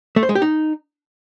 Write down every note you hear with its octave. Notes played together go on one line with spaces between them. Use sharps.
A3
C5
G#3
G4
D#4